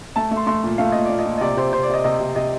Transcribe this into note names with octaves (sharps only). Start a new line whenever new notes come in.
A3 A5
A3
C6
A3 C6
A#2
A3 F5
A#2 D#5
A#2 D5
D#5
A#2
D#5
C3 D5
C3 C5
C3 C5
D5
C3 D#5
C3 D#5
C3
C3 D#5